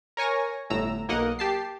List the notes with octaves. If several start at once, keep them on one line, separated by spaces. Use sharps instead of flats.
A#4 C#5 G#5 C#6 A#6
G1 A2 A#5 E6
B1 A#3 A#4 D#5 F#5
G4 A5 C7